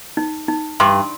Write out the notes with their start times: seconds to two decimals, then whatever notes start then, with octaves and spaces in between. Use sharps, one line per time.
0.17 D#4
0.48 D#4
0.80 G2 C6